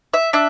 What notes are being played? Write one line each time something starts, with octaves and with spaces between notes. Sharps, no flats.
E5
D4 E5